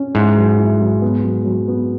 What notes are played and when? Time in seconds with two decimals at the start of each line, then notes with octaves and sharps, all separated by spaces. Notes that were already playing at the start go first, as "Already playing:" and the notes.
Already playing: C#4
0.15 G#2 E4
0.37 F#3
0.58 E4
0.80 F#3
1.02 B3
1.24 F#3
1.46 F#3
1.68 B3